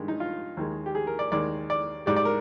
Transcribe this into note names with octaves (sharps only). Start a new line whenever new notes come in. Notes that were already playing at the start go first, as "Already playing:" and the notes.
Already playing: G2 D#3 G#3
D#4
F4
D#2 D#3 G#3
G4
G#4
A#4
D5
D#2 D#3 G#3 D5
D5
G#2 G3 D5
D5
A#4